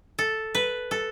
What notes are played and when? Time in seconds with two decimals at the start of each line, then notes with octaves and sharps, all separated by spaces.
0.19 A4
0.55 B4
0.91 A4